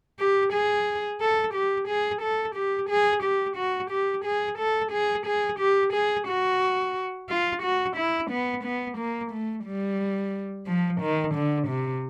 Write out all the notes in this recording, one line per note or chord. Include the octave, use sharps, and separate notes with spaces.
G4
G#4
A4
G4
G#4
A4
G4
G#4
G4
F#4
G4
G#4
A4
G#4
G#4
G4
G#4
F#4
F4
F#4
E4
B3
B3
A#3
A3
G3
F3
D#3
D3
C3